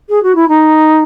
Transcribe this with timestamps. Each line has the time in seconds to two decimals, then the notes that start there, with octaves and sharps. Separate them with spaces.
0.09 G#4
0.23 F#4
0.35 E4
0.48 D#4